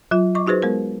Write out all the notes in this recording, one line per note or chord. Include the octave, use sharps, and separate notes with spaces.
F#3 F4
D#5 C#6 D6
D#4 F#4 G#4 B4 C5
G#3 B3 A#4